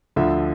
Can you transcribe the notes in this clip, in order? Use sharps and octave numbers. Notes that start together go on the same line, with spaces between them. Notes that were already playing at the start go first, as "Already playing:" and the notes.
D2 D3 F3 E5